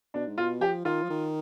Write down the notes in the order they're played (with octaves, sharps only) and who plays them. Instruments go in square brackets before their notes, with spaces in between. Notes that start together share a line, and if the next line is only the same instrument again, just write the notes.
[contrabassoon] B2 [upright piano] D4
[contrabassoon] G#2
[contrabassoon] B2 [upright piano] F4
[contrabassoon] F3 [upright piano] G4
[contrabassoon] D#3 [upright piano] F4
[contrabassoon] F3
D#3